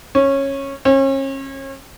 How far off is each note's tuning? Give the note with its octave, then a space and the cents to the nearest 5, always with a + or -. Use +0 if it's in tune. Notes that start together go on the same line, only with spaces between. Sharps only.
C#4 -15
C#4 -35